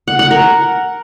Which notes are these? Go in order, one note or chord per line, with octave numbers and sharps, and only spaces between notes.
F#5
F#5
A#4